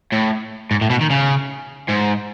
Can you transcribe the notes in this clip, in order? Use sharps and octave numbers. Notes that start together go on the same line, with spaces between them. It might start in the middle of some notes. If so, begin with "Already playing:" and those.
A2
G#2
A2
B2
D#3
C#3
G#2